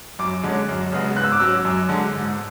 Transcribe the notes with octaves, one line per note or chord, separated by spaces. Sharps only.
F#2 D6
D3 G#3 C#4
F#2
C#3 G#3 B3
G#2 F#6
E6
D6
F#3 C#4 E6
F#2
D3 G#3
G#2